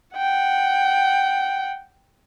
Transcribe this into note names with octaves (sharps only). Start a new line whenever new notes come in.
F#5 G5